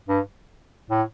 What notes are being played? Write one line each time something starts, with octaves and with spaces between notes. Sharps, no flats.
G2
A2